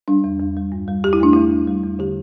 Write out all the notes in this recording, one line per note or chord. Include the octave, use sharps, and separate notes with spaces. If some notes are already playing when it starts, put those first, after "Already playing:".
G3 D4
E2
E2
G3
G2
G3
E2 G4
E4
A3 D4
E2 E4
E2
G3
E2
D3 G4